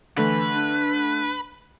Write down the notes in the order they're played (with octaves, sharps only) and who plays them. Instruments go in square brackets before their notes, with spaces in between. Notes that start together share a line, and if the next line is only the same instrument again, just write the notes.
[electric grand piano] D3 A3 [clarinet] E3 [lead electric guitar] B4
[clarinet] D4